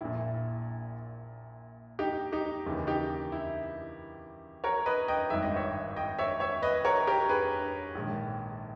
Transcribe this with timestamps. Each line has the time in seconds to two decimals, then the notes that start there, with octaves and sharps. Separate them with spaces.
0.01 A#1 A#2 E4
1.99 D#4 G4
2.32 D#4 G4
2.66 D#2 C#3 E3
2.87 D#4 G4
3.32 E4
4.64 A#4 C#5
4.86 B4 D#5
5.08 D#5 G5
5.30 G#1 G2 D#3 E5
5.43 D#5
5.56 C#5 E5
5.96 D#5 G5
6.18 C#5 E5
6.40 C#5 E5
6.62 B4 D#5
6.85 A#4 C#5
7.07 G4 A#4
7.29 G#4 B4
7.95 A#1 G#2 D#3